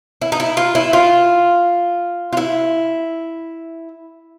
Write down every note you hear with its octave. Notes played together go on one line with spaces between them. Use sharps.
E4
D#4
E4
F4
E4
F4
F4
E4